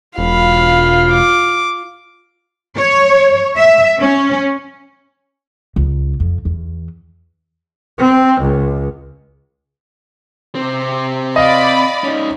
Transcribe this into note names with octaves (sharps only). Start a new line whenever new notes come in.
E1 F4 F5 B5
D6
C#5
E5
C#4
C#2
F2
E2
C4
C#2
C3 C4
D5 D#5 F5 B5
C#4 D#4